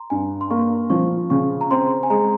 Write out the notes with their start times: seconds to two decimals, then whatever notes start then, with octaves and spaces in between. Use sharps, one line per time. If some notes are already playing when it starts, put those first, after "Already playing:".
Already playing: A#5 C6
0.10 G2 G#5
0.41 C6
0.50 A#3 C#6
0.90 F3 C#6
1.30 C#3 C#6
1.61 A#5
1.71 C4 C6
2.03 G#5
2.10 G#3 A#5